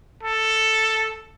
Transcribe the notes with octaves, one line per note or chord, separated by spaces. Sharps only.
A4